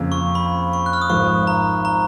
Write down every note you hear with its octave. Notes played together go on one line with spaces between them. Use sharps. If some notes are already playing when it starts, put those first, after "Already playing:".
Already playing: F2 C#3 F3 A#3
C#6
B5
C#6
F#6
F6
D#6
G#1 G#2 F3 C#6
A#5
A#5